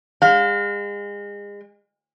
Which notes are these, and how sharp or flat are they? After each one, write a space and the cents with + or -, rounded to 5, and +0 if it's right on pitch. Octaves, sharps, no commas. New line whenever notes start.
G#3 -35 F5 +30